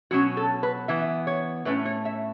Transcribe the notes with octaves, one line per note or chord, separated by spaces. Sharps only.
B2 F#3 C#4 F#4
A4
B4
E3 B3 E5
C#5
A2 A3 C#4 B4
C#5
E5